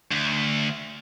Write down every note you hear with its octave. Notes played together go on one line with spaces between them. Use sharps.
D2